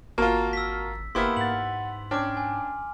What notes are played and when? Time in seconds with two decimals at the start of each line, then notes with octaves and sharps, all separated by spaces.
0.18 G#1 A#3 F4 F#4 A#4 A5
0.53 E6 B6
1.15 F#1 A#3 B3 E4 G4 A#4 C6
1.37 G#2 F#5 A6 F#7
2.11 C#4 D4 G5 D6 F6
2.37 G#5